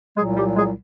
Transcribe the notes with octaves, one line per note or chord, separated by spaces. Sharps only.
C2 A#2 F#3 G#3 G#4
G3 G4
G#3 G#4